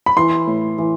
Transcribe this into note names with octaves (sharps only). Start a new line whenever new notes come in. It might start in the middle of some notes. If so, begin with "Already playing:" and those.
B5
E3 C6
A2
E3